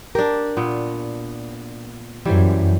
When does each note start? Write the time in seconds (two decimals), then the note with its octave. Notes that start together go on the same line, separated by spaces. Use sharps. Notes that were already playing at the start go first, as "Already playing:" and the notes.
0.15 D4 G4 A#4
0.57 A#2 B3
2.25 F#2 E3 G3 E4 C5